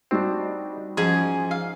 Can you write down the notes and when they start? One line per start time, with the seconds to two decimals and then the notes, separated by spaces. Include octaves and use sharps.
0.11 G3 C4 D4 D#4 F#4
0.97 G#2 F3 C#4 G#4
1.51 F5